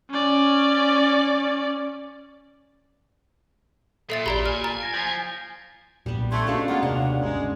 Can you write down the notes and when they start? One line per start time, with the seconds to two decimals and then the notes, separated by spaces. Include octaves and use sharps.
0.10 C#4 D5
4.10 A#2 A4 E5 A6 C7 D7
4.26 A1 G4 D5 A#5 B5
4.46 G#5 F6
4.64 A#5 A6
4.81 G#6 A#6 D7
4.94 F3 G6 B6 C7
6.06 B1 A#2 G3 B3
6.32 A3 D4 C5 F#5 C6 C#6 G#6
6.47 G#3 B3 C#4 F#4 F5
6.68 G#3 A#3 F4 F#5 A#5
6.83 D#2 C3 D4
7.21 D1 G1 G#3 C#4